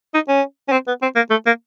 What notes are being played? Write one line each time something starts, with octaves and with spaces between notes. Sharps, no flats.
D#4
C#4
C#4
C4
B3
C4
A#3
A3
A#3